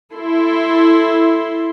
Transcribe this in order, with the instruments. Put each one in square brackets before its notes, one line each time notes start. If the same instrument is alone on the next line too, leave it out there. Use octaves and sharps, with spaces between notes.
[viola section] E4 A4 C6